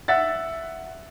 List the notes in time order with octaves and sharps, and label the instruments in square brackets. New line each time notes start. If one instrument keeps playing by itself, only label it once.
[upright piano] E5 F#5 A6